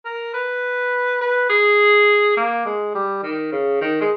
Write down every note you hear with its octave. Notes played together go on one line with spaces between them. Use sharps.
A#4
B4
B4
G#4
A#3
G#3
G3
D#3
C#3
D#3
G#3